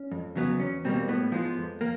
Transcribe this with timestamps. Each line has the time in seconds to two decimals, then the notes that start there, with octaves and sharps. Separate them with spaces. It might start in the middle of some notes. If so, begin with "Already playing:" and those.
Already playing: C#4
0.12 F2
0.36 C#3 F#3 B3
0.59 E2 C#4
0.85 B2 G3 A#3 C4
1.08 A2 B3
1.32 F3 G#3 B3
1.57 F2
1.81 A#3